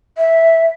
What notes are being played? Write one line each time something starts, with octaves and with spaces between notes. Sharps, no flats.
E5